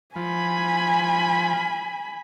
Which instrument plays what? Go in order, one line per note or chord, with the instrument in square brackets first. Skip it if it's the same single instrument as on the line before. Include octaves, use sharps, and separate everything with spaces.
[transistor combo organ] F3 [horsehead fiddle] G#5 B5